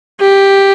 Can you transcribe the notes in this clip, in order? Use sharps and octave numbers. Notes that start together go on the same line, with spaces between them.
G4